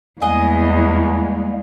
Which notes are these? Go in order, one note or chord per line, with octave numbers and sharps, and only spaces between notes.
E2 G3 G#3 A#3 G#4 D#5 F#5